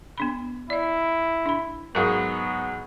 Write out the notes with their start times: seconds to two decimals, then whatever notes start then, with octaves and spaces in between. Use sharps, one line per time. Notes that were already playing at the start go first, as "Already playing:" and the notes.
0.18 B3 D4 B5
0.70 E4 D5 D#5
1.46 D4 B5
1.95 G#2 F#3 B3 G#4 A#4 F5